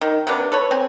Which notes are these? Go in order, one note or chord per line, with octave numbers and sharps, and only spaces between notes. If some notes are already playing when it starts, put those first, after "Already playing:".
D#3
C3 A#3 B3 D4
A4 B4 C#5
C4 G#5